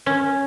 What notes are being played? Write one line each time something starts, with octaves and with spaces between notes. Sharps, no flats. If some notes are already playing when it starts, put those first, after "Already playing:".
C#4